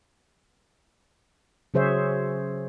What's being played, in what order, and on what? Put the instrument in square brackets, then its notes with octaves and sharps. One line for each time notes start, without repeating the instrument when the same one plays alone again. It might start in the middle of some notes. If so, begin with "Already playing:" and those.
[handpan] C#3 F#3 G#4 C5 C#5 E5